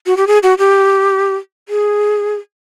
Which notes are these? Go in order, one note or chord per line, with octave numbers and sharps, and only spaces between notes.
F#4
G4
G#4
F#4
G4
G#4